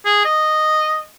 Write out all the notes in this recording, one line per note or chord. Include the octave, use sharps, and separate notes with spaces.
G#4
D#5